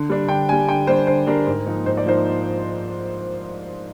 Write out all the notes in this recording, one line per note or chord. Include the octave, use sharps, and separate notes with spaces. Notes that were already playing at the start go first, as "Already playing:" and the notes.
Already playing: D3
G3 D4
D3 G5
G3 D4 G#5
D3 G5
G3 D4 C5
D3 C5
G3 D4 A#4
G#2
F3 A#3 D#4
G#2 C5
D5
F3 A#3 D#4 C5